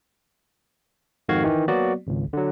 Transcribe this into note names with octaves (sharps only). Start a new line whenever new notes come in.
F2 G#2 D#3 F#4 F5 G#6
D#3 E3
F#3 A#3 B3 F#4 D5
G#1 C#2
D3 F#3